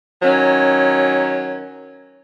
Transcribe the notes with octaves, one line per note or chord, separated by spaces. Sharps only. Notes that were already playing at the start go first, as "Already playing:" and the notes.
D#3 F#3 C#4